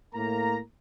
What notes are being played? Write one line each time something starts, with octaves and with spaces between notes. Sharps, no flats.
A2 A#3 A#5